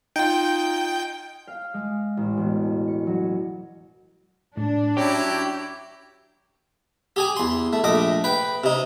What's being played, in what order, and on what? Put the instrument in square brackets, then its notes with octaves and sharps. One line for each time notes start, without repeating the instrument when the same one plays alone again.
[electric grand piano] D#4 F4 [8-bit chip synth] G5
[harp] F5
G#3
A1
E1
C#7
F#3
[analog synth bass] A2 [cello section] D4
[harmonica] F#3 E4 [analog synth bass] C#4 [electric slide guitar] G4
[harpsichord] G4 G#4 G#5
E2 C6
A3
A#1 A3 D#5 D6
B4 G5
C3 D#4